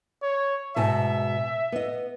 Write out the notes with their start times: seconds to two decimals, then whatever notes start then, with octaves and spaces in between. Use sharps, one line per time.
0.22 C#5
0.76 G#2 B2 E5 A5
1.72 B3 D#5